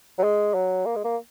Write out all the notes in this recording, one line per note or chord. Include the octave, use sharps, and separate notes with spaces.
F#3
G#3
F#3
A#3
G#3
A#3